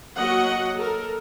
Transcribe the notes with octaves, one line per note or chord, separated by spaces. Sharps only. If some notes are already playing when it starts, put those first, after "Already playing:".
F#3 A#3 F#4 D#5 F#5
A4 A#4